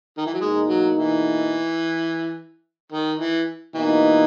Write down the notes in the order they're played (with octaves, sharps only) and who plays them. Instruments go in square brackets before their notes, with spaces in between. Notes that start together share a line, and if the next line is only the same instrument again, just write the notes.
[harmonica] D#3
E3
F#3
[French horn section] E2 B2 A#3 D#4 [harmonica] G#3
[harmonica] F#3
E3
D#3
E3
[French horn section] B2 A#3 D#4 [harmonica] E3